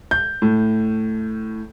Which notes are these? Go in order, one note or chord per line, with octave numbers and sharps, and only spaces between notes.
G6
A2